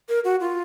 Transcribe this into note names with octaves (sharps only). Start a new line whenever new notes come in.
A#4
F#4
F4